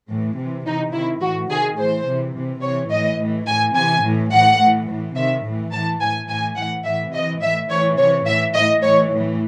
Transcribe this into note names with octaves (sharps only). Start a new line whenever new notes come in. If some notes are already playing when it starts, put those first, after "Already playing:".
A2 E3
C3 E3
C3 E3 D#4
C3 D#3 E4
A2 E3 F#4
C3 D#3 G#4
A2 E3 C5
C3 E3
C3 E3
C3 E3 C#5
A2 E3 D#5
A2 E3
A2 E3 G#5
C3 E3 G#5
A2 E3
A2 E3 F#5
A2 E3
A2 E3
C3 D#3 E5
A2 E3
A2 E3 A5
A2 E3 G#5
A2 E3 G#5
A2 E3 F#5
A2 E3 E5
C3 D#5
E3
A2 E3 E5
A2 E3 C#5
C3 E3 C#5
A2 E3 E5
A2 E3 D#5
A2 E3 C#5
A2 E3